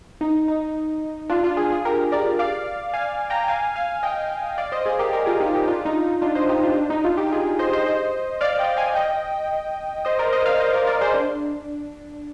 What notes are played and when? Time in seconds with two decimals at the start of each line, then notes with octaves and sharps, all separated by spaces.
0.21 D#4
0.48 D#4
1.30 D4 F4
1.43 D4 F4
1.57 F4 G#4
1.71 F4 G#4
1.85 G4 A#4
2.12 A#4 D5
2.39 D5 F5
2.94 F5 G#5
3.30 G5 A#5
3.48 F5 G#5
3.76 F5 G#5
4.03 D#5 G5
4.58 D5 F5
4.72 C5 D#5
4.85 G#4 C5
4.99 G4 A#4
5.13 G4 A#4
5.26 F4 G#4
5.40 D#4 G4
5.54 D#4 G4
5.68 D4 F4
5.85 D#4
6.04 D#4
6.22 D4 F4
6.35 C5 D#5
6.49 D#4 G4
6.63 D4 F4
6.77 D4
6.90 D#4
7.04 D4 F4
7.17 D#4 G4
7.31 F4 G#4
7.59 C5 D#5
7.73 C5 D#5
7.86 C5 D#5
8.41 D5 F5
8.59 D#5 G5
8.77 F5 G#5
8.95 D#5 G5
10.05 C5 D#5
10.19 A#4 D5
10.32 C5 D#5
10.46 D5 F5
10.60 C5 D#5
10.73 A#4 D5
10.87 A#4 D5
11.01 G#4 C5
11.14 D4